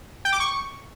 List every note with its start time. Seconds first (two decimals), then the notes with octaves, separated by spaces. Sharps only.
0.25 G5
0.33 D6
0.40 C#6